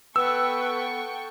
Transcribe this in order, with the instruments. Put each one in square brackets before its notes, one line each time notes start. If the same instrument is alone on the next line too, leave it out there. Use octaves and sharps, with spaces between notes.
[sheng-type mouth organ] B3 [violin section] A4 G5 C#6 [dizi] B4 [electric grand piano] E6